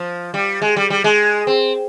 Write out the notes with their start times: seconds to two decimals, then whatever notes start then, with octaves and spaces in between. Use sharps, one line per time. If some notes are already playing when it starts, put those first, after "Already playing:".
Already playing: F3
0.34 G3
0.62 G#3
0.77 G3
0.90 G3
1.04 G#3
1.47 C4